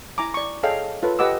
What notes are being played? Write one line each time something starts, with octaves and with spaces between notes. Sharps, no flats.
E4 G#5 A#5 D6
D5 C#6
G#4 A4 C#5 D#5 F5 G5
F4 A4 B4 C#5
G4 B4 D#5 F#5 D6 E6